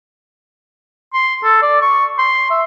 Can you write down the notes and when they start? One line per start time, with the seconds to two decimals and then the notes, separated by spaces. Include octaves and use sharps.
1.14 C6
1.44 A4
1.62 D5
1.82 C#6
2.19 C6
2.51 E5